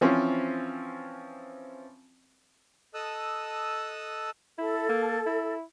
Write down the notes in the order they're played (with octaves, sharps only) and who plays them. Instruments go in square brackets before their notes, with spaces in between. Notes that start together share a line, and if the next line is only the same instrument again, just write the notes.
[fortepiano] E3 F3 C4 C#4 F4
[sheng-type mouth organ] A4 D#5 A5 D#6 E6 F#6
[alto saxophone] E4 [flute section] A4
[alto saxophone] A#3
E4